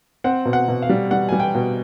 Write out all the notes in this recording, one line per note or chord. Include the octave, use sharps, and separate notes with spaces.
C4 F#5
B2
F#5
B2
F5
G3
G3 F#5
G3 G#5
G5
B2